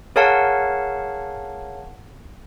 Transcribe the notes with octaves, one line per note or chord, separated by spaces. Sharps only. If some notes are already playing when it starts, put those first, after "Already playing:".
G#4 A#4 C#5 F5 F#5 A5